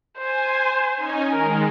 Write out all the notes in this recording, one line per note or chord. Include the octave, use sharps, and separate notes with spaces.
C5 G#5
C#4 D#4 G#5
D#3 G#3 A#4